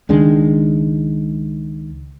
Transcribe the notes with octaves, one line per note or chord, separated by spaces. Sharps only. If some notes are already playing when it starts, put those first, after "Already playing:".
C#2 D#3 G#3 D4